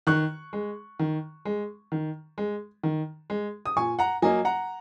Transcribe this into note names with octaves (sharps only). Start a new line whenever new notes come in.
D#3 C#6 F#6
G#3
D#3
G#3
D#3
G#3
D#3
G#3
D#6
A#2 G#5 C#6
F#5 A#5
F#3 A#3 D#5 G#5
F#5 A#5